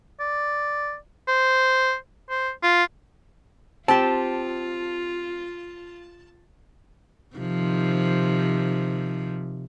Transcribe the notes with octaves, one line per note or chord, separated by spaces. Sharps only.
D5
C5
C5
F4
C4 F4 G4 A5
C3 D#3 F3